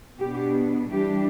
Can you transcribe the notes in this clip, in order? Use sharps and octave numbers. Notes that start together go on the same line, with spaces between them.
B2 B3 D4 G4
E3 G3 D4 G4